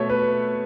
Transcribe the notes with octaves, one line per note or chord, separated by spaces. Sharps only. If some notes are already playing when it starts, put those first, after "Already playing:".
Already playing: B2 A3 C#5 E5
B4